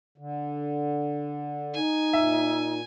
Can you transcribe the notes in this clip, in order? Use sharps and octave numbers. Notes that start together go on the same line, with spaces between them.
D3
D#4 G#5
A#2 E5